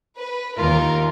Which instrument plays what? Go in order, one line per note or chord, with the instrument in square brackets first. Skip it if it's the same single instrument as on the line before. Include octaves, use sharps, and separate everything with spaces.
[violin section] B4
[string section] D#2 [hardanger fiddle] F4 [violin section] A#4